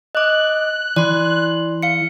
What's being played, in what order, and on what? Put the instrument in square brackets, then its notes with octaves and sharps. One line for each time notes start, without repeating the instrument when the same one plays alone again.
[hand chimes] D#5 D6 [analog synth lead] F#6
[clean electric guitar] E3 [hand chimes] D5 C6
[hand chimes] F5 C#7